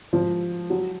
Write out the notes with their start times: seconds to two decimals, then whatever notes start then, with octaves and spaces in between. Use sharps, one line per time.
0.13 F3
0.70 F#3